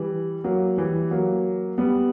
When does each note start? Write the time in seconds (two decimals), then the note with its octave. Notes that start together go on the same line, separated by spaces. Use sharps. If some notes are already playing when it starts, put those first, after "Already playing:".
Already playing: E3 G3
0.44 F#3 A#3
0.77 E3 G3
1.11 F#3 A#3
1.78 G3 B3